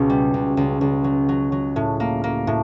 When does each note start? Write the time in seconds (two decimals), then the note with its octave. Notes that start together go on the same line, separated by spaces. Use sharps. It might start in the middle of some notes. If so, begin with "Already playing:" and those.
Already playing: C#2 B2
0.10 G3
0.34 C#2
0.57 C#2
0.81 C#2
1.04 F#3
1.29 F#3
1.52 F#3
1.76 A2
2.00 A#3
2.24 A#3
2.47 A2